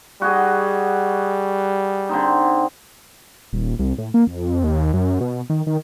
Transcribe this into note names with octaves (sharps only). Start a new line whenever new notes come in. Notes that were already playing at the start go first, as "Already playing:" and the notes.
G3 F#4 G#4 D#5
D3 C4 D#4
D#1
C2
A2
A#3
F2
D#2
F#2
B2
D#3
D#3